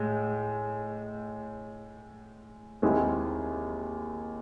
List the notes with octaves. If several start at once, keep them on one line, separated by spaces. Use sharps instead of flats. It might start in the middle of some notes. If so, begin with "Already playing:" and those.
Already playing: A2 G#3
D#2 D#3 G#3 C4 E4